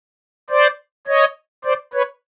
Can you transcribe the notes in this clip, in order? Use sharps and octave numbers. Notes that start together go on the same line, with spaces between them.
C5 D5
C#5 D#5
C5 D5
B4 C#5